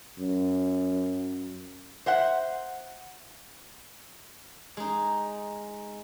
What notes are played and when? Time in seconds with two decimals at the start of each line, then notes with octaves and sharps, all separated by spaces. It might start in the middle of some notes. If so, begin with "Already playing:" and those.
0.19 F#2
2.06 C5 E5 F#5
4.77 G#3 D#4